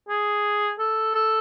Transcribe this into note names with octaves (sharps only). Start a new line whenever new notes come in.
G#4
A4
A4